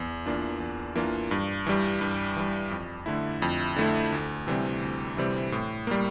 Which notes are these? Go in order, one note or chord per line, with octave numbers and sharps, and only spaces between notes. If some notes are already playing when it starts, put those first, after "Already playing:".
Already playing: E2
E3 A#3 D4 F4
E2
E3 A#3 D4 F4
G2
E3 G3
G2
E3 G3
F2
D3 A3 E4
F2
D3 A3 E4
D2
C3 E3 G3 C4
D2
C3 E3 G3 C4
A2
G3 A#3